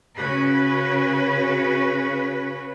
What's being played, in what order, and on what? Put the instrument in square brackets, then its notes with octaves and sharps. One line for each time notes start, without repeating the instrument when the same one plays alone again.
[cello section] C#3 C#4 F#4 B4